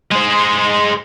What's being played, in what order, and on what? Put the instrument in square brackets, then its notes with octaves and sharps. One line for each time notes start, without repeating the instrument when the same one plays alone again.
[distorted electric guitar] G#3 C5